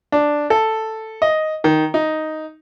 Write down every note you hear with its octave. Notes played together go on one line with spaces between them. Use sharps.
D4
A4
D#5
D#3
D#4